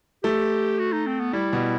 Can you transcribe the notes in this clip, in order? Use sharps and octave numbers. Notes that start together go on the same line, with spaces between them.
A3 G4
F#4
D#4
C4
B3
G3 E4
B2